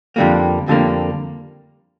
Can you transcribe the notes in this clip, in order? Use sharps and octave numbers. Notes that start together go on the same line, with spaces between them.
F2 D3 G3 A#3
F2 D3 G3 A#3